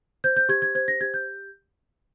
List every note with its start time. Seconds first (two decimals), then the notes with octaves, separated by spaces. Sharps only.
0.24 C5 G6
0.37 G6
0.49 G4 G#6
0.62 G#6
0.75 C5 G#6
0.88 A#6
1.01 G4 G#6
1.14 G6